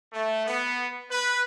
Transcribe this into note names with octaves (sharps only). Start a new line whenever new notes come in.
A3
B3
B4